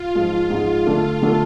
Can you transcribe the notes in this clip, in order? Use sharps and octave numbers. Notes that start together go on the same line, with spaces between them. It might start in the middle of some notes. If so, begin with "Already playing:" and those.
Already playing: F4
G#2 F3 G#3
G#2 F3 G#3
D3 A3 D4 A4
D3 A3 D4 A4